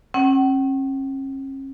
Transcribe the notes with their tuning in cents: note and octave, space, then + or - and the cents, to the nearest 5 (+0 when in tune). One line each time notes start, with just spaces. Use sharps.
C#4 -40 F#5 +45